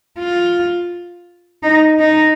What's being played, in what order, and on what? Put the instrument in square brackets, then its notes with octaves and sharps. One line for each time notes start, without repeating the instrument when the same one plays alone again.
[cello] F4
D#4
D#4